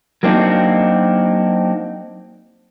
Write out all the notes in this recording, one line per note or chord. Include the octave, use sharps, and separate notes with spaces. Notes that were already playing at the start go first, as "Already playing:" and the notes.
F#3 A#3 C4 D4 D#4 F#4